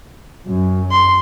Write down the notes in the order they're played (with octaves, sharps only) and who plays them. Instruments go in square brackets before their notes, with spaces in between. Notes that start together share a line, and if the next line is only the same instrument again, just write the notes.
[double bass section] F#2
[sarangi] C6